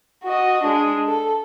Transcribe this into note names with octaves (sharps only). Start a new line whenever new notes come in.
F#4 D#5
G#3 D4
A4